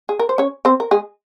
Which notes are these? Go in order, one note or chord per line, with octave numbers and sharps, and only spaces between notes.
G#4
A#4
C5
C#4 C#5
C4 C5
A#4
G#3 G#4